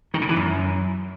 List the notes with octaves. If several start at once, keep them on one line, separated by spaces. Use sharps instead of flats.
D#3
C#3
E3
F#2